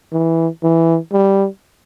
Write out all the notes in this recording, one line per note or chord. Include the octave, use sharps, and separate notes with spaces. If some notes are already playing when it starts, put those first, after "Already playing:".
E3
E3
G3